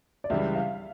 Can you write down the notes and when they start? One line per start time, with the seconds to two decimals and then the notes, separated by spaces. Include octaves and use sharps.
0.24 D5
0.30 C#2 C#3 E3 G3 E5
0.56 F5